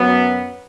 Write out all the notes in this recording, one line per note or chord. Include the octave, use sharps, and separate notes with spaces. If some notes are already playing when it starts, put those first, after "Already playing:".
Already playing: F#2 F#3 B3